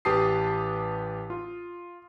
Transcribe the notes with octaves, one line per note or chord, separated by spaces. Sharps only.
A1 G4 B4 A5 D#6 C7
F4